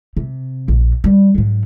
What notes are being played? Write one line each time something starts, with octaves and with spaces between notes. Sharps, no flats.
C3
A#1 E2
G3
G#2 F#3